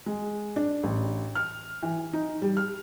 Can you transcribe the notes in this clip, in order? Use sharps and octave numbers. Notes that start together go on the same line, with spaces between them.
G#3
D4
A1
F6
E3
D#4
G3
F6